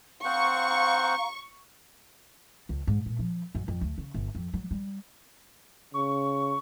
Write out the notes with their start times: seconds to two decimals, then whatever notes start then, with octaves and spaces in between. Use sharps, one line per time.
0.25 C4 C5 F5 F#5 A#5 C#6
2.69 C#2
2.87 G#2
3.06 A#2
3.19 F3
3.55 F#2
3.68 F2
3.81 D2
3.98 C#3
4.14 G1
4.35 F2
4.54 F#3
4.71 G3
5.94 C#3 C#6